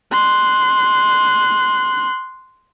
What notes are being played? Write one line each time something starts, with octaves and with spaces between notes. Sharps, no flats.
C6 F#6